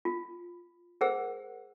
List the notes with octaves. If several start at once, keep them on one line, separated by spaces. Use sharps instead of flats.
F4
G#4 A#4 C5 F#5 E6